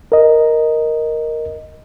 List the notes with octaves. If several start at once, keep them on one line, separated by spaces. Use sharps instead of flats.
A#4 D#5